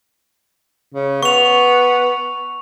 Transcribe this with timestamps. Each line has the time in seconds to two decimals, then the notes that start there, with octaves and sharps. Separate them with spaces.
0.94 C#3
1.23 B3 C#6 F7